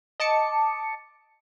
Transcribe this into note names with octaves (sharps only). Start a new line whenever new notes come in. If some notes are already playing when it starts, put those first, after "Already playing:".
D#5 A5 D6 C#7